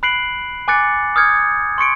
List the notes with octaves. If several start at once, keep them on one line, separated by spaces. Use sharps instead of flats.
B5 F#6 C7 D7 F#7
G#5 D6 F#6 A6 C#7
D#6 F6 G6 G#6 C#7
C6 C#6 C#7 D7